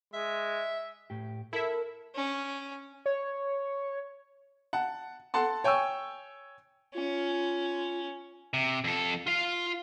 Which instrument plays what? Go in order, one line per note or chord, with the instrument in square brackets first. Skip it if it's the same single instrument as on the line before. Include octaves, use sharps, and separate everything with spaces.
[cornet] G#3 [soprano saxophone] E5
[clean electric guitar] A2 G4
[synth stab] E4 E5 [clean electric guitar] A4 [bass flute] A#4
[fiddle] C#4
[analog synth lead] C#5
[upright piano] F#5 A5
A4 F#5 A5 C6
C#5 G5 G#5 C#6 E6
[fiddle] C#4 [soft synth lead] F4
[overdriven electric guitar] C3
F2 A4
F4 F5